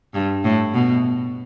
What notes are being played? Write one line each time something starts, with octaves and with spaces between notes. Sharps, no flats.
G2
A2
B2